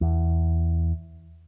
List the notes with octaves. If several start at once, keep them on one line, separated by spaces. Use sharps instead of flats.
E2